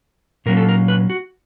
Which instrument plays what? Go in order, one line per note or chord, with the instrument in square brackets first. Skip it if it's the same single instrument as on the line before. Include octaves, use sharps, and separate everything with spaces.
[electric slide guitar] A#2 F#3 A#3 C#4 A#4
A4
A#4
B4
F#4